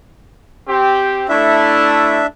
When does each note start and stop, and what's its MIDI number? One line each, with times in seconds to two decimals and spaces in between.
0.68 1.24 60
0.68 1.24 67
1.29 2.22 57
1.29 2.26 62
1.29 2.22 64
1.29 2.26 76